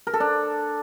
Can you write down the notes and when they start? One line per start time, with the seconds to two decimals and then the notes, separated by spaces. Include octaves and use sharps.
0.07 A#4
0.14 A4
0.20 D4